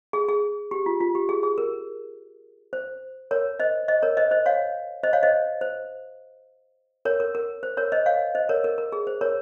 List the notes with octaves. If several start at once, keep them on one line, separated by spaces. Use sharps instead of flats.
G#4
G#4
G4
F4
F4
G4
G#4
G#4
A#4
C5
A#4 C#5
C5 D#5
C5 D#5
A#4 C#5
C5 D#5
C5 D#5
C#5 F5
C5 D#5
C#5 F5
C5 D#5
C5
A#4 C#5
A#4
A#4
C5
A#4 C#5
C5 D#5
C#5 F5
C5 D#5
A#4 C#5
A#4
A#4
G#4
C5
A#4 C#5